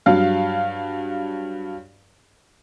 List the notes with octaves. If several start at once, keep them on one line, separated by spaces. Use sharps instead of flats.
G2 F#3 F5